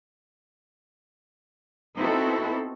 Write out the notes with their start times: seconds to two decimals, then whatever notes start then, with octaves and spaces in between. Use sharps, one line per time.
1.96 B3 C4 D#4 E4 F#4 A4